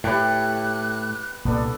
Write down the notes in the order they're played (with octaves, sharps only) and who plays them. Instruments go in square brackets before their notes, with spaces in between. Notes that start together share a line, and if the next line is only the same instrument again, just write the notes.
[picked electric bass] A2 [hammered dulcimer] G4 B4 [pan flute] F#6
[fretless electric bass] C2 A#2 A#3 [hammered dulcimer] B3 D4 A4